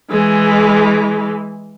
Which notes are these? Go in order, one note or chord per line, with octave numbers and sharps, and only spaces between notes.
E3 G#3